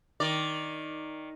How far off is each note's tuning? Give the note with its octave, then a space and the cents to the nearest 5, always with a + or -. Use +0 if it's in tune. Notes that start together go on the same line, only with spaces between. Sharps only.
D#3 +0 D5 +0